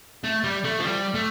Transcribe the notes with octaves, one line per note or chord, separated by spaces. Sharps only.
A3
G3
A3
F3
G3
A3